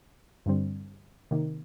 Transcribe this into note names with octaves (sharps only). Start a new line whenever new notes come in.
G2 D3 G3 C4
C3 D#3 A#3